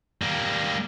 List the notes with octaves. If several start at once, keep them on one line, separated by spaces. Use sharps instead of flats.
G3 A#3